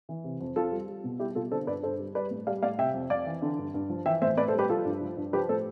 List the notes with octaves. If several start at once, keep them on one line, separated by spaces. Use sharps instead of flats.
E3
C3
F2
F2 F4 A4
G3
G3
B2
G3 E4 G4
B2 F4 A4
D3 A4 C5
G2 B4 D5
G2 A4 C5
G3
G3 B4 D5
A2
G3 D5 F5
A2 D5 F5
C3 E5 G5
F2
F2 D5 F5
E3
D3
G2
G2
F3
E3 E5 G5
A2 C5 E5
A2 B4 D5
A4 C5
G3 G4 B4
F3 F4 A4
G2
F3
G2
F3 G4 B4
A2 A4 C5